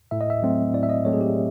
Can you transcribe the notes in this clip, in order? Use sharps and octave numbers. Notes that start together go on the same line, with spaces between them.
A2 E5
D#5
E5
F#3 A3 C4
A2 D5
E5
D#5
F#3 A3 C4 C#5
G#4
G4